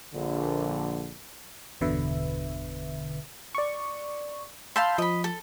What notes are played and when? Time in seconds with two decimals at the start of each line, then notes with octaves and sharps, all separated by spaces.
0.13 A#1 D3
1.81 G1 E2 B2 D3 B4 E5
3.55 D5 C#6
4.76 F5 A5 B5 C6 E6 G6
4.98 F3 D#5 B5
5.24 A4